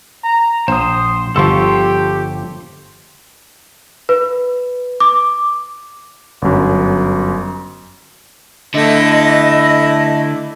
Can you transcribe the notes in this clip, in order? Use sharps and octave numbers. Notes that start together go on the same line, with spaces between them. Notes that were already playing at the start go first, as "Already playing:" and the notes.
A#5
A#1 C5 C6 D#6
G1 F3 G4 A4 C6 C#6
B4
D6
G1 F#2
D3 A3 E4 D#5